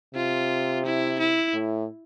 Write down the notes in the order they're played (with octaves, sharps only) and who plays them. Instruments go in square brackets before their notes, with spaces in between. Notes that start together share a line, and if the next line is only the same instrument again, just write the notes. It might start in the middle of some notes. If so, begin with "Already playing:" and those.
[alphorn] C3 [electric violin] F4
[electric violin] E4
E4
[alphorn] A2